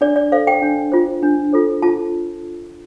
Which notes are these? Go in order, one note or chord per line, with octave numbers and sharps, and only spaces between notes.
D4 D5
D5
A4 C5 F5
G5
D4
F4 C5
D4
F4 A4 C5
F4 A5